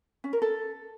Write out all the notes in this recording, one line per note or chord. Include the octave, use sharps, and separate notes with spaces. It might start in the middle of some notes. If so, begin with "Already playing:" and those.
C#4
A#4
A4